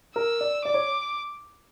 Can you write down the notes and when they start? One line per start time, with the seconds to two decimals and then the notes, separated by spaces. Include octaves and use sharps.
0.16 A#4 E6
0.41 D5
0.65 D5 D6
0.74 C#5